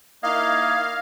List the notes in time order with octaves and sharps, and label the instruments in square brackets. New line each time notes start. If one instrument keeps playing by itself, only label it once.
[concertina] A#3 D#5 [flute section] D#4 E4 G#6 [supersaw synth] F5